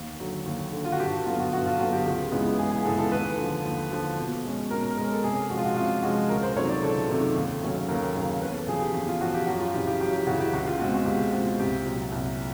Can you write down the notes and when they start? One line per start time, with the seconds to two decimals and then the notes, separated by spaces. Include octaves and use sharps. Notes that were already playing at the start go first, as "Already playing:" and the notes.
Already playing: D#2
0.20 D3 F#3
0.46 D#2
0.73 D3 F#3
0.85 F4
0.92 F#4
1.00 G2 G4
1.13 F#4
1.26 D3 F#3 B3 F4
1.40 F#4
1.53 G2 F#4
1.66 F4
1.79 D3 F#3 B3 F#4
1.92 G4
2.05 C#2 G4
2.31 C#3 E3 G#3 B3
2.59 C#2 G#4
2.71 G#4
2.85 C#3 E3 G#3 B3 A4
2.99 A4
3.11 D#2 B4
3.37 D3
3.43 F3
3.65 D#2
3.91 D3 F3
4.17 B2
4.43 G#3 C#4
4.71 B2 A#4
4.83 A#4
4.96 G#3 A#4
5.02 C#4
5.11 A4
5.23 C3 G#4
5.50 F3 G#3 C#4 F#4
5.58 F4
5.65 F#4
5.76 C3 F4
6.02 F3 G#3 C#4 F#4
6.29 C#2 A#4
6.43 C5
6.55 C3 D#3 F#3 A3 C#5
6.69 D5
6.83 C#2 A4
7.09 C3 D#3 F#3 A3
7.36 D#2
7.61 C#3 F#3 A3 C#4
7.88 D#2 A#4
8.15 C#3 F#3 A3 C#4
8.41 E2 B4
8.55 A4
8.67 C#3 F3 G#4
8.81 G4
8.94 E2
9.08 F4
9.21 C#3 F3 F#4
9.34 G4
9.47 F#2 F#4
9.60 F4
9.74 C#3 E3 G4
9.87 G4
10.00 F#2 G4
10.13 G4
10.27 C#3 E3 F#4
10.40 G4
10.53 C#2 F#4
10.67 F4
10.79 B2 G#3 C4 F#4
10.93 F#4
11.06 C#2 G4
11.32 B2 G#3 C4
11.59 C2 G4
11.85 A#2 F#3
12.12 C2